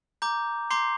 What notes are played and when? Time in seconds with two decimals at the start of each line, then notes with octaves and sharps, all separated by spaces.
0.22 A#5 D6 G6
0.70 A#5 C6 D6 G6 C7